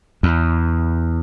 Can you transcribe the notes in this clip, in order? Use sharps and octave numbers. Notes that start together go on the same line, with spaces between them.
E2